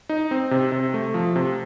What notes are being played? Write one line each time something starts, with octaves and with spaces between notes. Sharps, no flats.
D#4
C4
C3
C3
A3
F3
C3